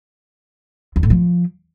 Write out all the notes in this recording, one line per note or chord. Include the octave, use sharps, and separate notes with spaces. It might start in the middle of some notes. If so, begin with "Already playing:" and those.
E2
A2
F3